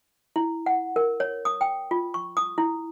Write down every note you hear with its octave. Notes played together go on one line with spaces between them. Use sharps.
E4
F#5
A#4
C#5
D#6
G5
F4
C#6
D#6
E4